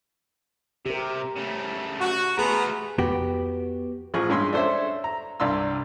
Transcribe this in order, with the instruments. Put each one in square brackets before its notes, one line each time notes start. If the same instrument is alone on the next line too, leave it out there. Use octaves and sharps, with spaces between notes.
[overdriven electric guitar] C3 [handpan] G4 A#4
[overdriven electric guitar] C#3 A3
[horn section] F#4
[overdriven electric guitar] A3 F4 [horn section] B3 A#5 [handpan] G#4
[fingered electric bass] F2 [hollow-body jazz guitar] B3 F#4 G4
[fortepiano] A1 F3 G#4 C#6
G2 G#3 C#4 C6 E6
D4 A4 C5 C#5 E5
A#5
C2 G2 D5 C6 E6